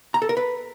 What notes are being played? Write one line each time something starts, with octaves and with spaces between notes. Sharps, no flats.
A#5
A4
A#4
B4